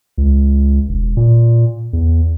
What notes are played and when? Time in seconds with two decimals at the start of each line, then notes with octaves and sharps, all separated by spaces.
0.18 C#2
0.89 E1
1.17 A#2
1.93 E2